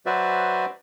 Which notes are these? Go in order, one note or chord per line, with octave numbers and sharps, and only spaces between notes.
F#3 F#4 B4 C5 D5 E5